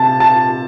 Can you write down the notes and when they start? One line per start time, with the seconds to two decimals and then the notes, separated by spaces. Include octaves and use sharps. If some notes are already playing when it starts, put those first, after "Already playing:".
Already playing: C3 A5
0.20 A5